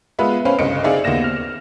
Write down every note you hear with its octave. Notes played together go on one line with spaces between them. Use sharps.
G#3 B3 F4 B4 E5
C4 C#4 C5 F5 B5
G1 C2 C#3 D#5 C#7 D7
C4 D#4 G#4 D5 E5 F5
D#2 A#3 B3 A#6 E7
F6